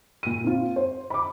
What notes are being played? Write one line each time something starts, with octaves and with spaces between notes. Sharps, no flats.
A#2 D#7
C4 F4
C5
B5 D6